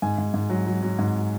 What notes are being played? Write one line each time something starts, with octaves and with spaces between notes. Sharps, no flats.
G#2 G#5
G#2
G#2
F#3
F#3
F#3
G#2